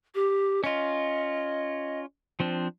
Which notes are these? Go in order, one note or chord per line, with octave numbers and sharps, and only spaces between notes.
G4
C#4 F4 D#5
F3 C4 D4